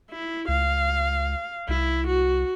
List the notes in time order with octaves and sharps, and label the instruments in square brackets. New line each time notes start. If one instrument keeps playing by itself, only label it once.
[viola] E4
[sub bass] C#2 [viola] F5
[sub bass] C2 [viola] E4
[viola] F#4